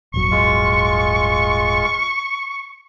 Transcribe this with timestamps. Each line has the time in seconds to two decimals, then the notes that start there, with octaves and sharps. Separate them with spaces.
0.14 D#1 G#1 F#3 C#6
0.31 G#3 F4